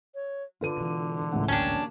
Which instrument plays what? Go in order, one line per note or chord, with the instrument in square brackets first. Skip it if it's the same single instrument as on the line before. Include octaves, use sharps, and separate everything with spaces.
[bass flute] C#5
[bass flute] D3 [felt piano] F4 B4 D#7
[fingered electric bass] B2 E3
[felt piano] C#2 A2 F#5
[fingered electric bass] A1 D2 G#2 [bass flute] A#3 [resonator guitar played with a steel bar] C#4 D4 [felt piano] G5 A5